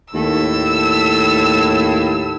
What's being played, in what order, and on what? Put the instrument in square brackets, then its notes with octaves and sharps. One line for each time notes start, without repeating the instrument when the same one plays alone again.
[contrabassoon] D#2 [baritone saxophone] A2 [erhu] E6